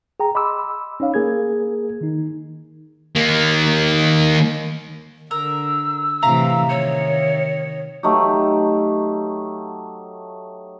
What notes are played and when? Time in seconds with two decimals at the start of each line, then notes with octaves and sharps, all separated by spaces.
0.20 G#4 G5 A#5
0.35 D#5 B5 C6 D6 E6
1.00 C#4 D#4 C#5 F5
1.14 A#3 G#4 A#4 G#6
2.01 D#3 D#4
3.16 D#3 A#3
5.31 D3 A#4 E6
6.23 A2 C3 E3 E5 F5 A#5
6.69 D#3 C#5 C#7
8.03 F#3 A3 D#4 G4